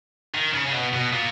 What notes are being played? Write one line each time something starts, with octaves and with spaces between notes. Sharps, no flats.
D#3
C#3
C#3
B2
B2
A#2